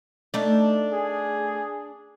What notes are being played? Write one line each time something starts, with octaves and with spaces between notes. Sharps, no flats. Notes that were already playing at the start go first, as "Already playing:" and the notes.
A3 D4 D#4 A5
G#4